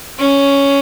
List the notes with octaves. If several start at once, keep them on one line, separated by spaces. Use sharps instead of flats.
C#4